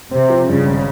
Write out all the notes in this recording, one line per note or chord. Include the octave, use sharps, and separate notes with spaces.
C3 C4
F3
G2 C#3
G#1